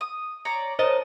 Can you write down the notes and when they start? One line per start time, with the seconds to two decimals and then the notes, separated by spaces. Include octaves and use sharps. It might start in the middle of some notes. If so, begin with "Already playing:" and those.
0.01 D#6
0.45 C#5 D5 A#5
0.79 A#4 C5 C#5 D#5 A5